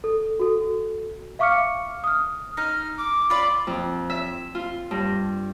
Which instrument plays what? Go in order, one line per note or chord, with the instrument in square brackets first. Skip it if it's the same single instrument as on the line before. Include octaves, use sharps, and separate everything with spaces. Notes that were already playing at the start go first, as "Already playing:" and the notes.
[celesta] A4
F#4 A4
E5 F5 C#6 D6 F6 C#7
D#6 F6
[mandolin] D#4 [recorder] F6
[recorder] D6
[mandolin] F4 D5 [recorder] B5
[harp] F2
E5
F4
G2